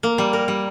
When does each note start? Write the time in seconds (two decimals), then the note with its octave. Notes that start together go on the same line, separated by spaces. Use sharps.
0.03 A#3
0.18 G3
0.33 A#4
0.48 G3